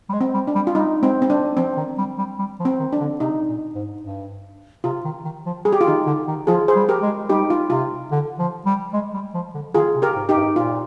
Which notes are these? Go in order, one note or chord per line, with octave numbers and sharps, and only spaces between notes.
G3
G#3
C4
G3
D4
G3
F4
G3 D#4
G#3 C4
C4
G3 D4
F3 C4
D#3
G3
G3
G3
F3
C4
D#3
D4
D3
C3 D#4
A#2
G#2
G2
C3 F4
D#3
D#3
F3
G3 G#4
G4
F4
D#3 D#4 G4
D3
D#3
F3 F4 G#4
G#4 C5
G3
G4 A#4
G#3
G3 D#4 G4
F4
C3 F4
D3
F3
G3
G#3
G3
F3
D3
D#3 F4 G#4
C3
G4 A#4
G#2
D#4 G4
G2
A#2 F4